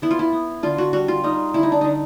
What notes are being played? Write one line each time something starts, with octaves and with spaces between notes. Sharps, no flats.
B3 E4
F4
E4
B3
D3 F4
F#4
G3 F#4
F4
G3 D#4
D3 E4
D#4
D4
D3 D#4